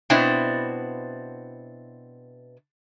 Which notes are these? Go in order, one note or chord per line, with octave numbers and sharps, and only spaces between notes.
B2 B3 C4 D4 E4